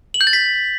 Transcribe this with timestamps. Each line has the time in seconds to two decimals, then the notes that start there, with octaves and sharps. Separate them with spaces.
0.14 F#7
0.21 G6
0.27 A6
0.33 B6